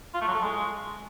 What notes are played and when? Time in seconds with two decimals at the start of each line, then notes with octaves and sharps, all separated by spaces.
0.14 F4
0.21 A3
0.28 F#3
0.35 A4
0.41 G#3